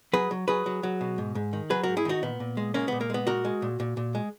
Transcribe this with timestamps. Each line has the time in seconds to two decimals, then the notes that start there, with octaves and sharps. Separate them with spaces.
0.13 F#3 G#4 B4
0.31 F#3
0.48 F#3 G#4 B4
0.66 F#3
0.83 F#3
1.01 B2
1.18 G#2
1.35 G#2
1.53 D#3
1.70 F#3 G#4 B4
1.83 G#2 F#4 A#4
1.97 E4 G#4
2.05 D#3 D#4 F#4
2.23 A#2 B3
2.40 A#2
2.57 G#3
2.74 G#3 A#3 C#4
2.88 A#2 B3
3.01 A#3
3.10 G#3 B3
3.27 A#2 F#4 A#4
3.45 G#3
3.62 A#2
3.80 A#2
3.97 A#2
4.15 G#3